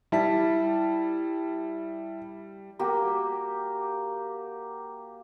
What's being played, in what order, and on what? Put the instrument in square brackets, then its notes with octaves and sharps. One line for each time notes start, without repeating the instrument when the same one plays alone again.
[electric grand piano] G3 A5 B6 [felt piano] E4
[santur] A#3 F#4 G4